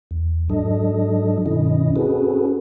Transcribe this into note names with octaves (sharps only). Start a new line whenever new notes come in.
E2
G#2 F#3 D4 A4 D#5
G2 B2 D#3 C#4 E4 D#5
C4 C#4 F#4 G#4 A4 B4